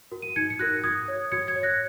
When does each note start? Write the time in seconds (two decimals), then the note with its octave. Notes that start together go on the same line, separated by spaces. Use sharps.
0.12 F#4 A#4
0.22 D#7
0.36 D#4 G#6 C#7
0.50 C#7
0.59 F#4 A#4 F#6 A#6
0.84 F#4 D#6 G#6
1.08 C#5
1.32 F#4 G#6 C#7
1.47 G#6 C#7
1.56 C#5
1.63 F#6 A#6